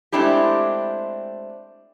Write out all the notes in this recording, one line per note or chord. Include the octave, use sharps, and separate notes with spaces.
G#3 A3 C4 D4 E4 G4